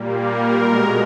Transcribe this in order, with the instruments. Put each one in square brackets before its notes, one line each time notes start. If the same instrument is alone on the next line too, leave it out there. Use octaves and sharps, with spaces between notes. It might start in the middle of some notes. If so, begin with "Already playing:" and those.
Already playing: [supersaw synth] A#2 G3 A#3
A#4
B2 G#3